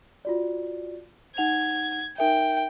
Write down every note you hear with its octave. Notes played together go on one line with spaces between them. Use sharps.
F4 F#4 D5
D#4 F#5 G#6 F7
D#4 A#4 E5 G5